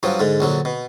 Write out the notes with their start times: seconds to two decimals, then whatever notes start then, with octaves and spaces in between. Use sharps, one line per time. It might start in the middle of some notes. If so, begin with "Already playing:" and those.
0.03 G2 F3 F#3
0.19 G#2 D3
0.40 A#1 D3 F#3
0.65 B2